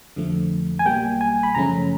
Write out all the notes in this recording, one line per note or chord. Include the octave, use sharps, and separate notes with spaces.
F2 D3 F3 A3
G#5
B1 B2 G3 A#3 G5
G#5
B5
F#2 C#3 F3 A3 C#4 A#5